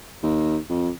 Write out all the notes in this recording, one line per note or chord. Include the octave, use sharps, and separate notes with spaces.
D#2
F2